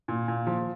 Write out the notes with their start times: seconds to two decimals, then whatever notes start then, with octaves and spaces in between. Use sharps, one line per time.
0.08 A#2
0.28 A#2
0.47 F3